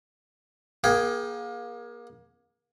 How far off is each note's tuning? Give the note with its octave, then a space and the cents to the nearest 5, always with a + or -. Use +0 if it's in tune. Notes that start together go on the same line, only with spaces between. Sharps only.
A#3 +30 G#4 +0 G5 +0